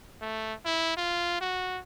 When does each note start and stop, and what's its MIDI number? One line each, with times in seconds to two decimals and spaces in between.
0.22 0.54 57
0.66 0.94 64
0.97 1.41 65
1.41 1.80 66